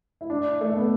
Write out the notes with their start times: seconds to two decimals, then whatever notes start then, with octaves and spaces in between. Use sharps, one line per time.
0.21 E4
0.30 D4
0.61 A3
0.77 B3